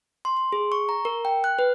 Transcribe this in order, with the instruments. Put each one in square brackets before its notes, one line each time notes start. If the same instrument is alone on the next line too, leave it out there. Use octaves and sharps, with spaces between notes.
[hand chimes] C6
C6
G#4
C#6
A#5
A#4
G5
F#6
B4